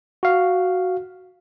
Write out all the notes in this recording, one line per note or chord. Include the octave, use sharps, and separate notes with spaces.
F#4 F5